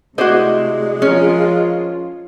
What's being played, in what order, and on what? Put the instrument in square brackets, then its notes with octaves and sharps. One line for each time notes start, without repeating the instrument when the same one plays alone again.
[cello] C3 A3 [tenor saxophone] G#3 [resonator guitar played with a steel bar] E4 D5 D#5 [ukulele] F#4 C5
[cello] F3 F4 [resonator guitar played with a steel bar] C#4 A#4